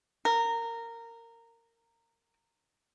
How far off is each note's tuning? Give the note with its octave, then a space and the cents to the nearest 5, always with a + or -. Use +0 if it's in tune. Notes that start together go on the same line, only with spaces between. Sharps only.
A#4 -15